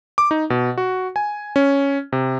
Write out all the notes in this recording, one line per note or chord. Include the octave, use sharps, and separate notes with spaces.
D6
D#4
B2
F#4
G#5
C#4
C3